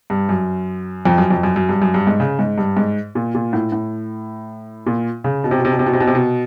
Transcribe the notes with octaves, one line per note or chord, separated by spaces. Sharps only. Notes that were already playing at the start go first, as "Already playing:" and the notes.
G2
F#2
F2
F#2
F2
F#2
F#2
G2
F#2
G2
G#2
C#3
G#2
G2
G#2
A#2
A#2
A2
A2
A#2
C#3
B2
C3
B2
C3
B2
C3
B2
C3
B2
C3
B2